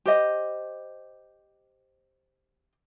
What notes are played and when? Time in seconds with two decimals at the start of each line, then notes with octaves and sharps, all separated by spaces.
0.06 G4 C5 D#5